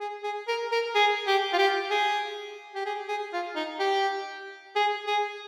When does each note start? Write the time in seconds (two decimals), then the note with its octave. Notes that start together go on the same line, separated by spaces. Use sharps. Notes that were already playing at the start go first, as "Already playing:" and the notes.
0.01 G#4
0.24 G#4
0.48 A#4
0.72 A#4
0.95 G#4
1.28 G4
1.53 F4
1.59 G4
1.91 G#4
2.75 G4
2.86 G#4
3.09 G#4
3.33 F4
3.56 D#4
3.80 G4
4.76 G#4
5.07 G#4